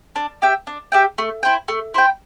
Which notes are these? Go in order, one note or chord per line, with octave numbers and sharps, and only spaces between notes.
D4
G4 E5 G5
D4
G4 E5 G5
A3
E4 C5 G5
A3
E4 C5 G5